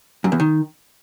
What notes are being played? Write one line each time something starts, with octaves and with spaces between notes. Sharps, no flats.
F#2
E2
D#3